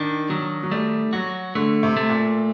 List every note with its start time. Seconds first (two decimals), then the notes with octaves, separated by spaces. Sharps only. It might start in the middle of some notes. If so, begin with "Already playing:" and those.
Already playing: D#3 D4
0.29 D#3 F#3
0.63 F#3
0.71 G3 A3
1.13 F#3 F#4
1.55 D3 A3
1.83 C3
1.97 A3
2.10 A#2